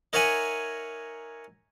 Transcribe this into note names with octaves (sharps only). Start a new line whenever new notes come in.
D#4 A#4 C#5 E5 F#5 G#5